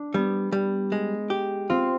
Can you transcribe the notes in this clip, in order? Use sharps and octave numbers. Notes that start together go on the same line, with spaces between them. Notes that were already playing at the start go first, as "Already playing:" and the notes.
Already playing: D4
G3 B3
G3
G#3
G4
C4 F4